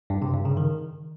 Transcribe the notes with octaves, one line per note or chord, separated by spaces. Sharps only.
G2
C3
G2
C#3
D#3